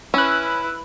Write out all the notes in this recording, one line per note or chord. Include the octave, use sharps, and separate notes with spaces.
C#4 E4 B4 E6 F#6